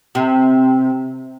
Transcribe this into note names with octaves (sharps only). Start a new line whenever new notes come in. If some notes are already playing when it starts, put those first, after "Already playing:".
C3